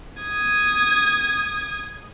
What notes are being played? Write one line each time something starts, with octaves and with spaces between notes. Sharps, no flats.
D#6 G#6